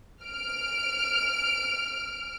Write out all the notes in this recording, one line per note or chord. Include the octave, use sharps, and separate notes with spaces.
F6 D7